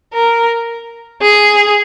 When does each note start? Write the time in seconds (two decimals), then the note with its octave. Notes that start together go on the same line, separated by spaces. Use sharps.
0.14 A#4
1.22 G#4